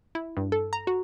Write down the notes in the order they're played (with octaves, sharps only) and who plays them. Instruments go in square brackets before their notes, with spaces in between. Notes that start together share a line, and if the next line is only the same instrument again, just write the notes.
[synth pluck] E4
G2
A4
A#5
F#4